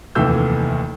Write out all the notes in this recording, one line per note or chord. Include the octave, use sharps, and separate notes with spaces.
F1 D#2 E3 A3 E6 G6